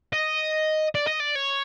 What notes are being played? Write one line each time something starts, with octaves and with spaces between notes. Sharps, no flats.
D#5
D5
D#5
D5
C#5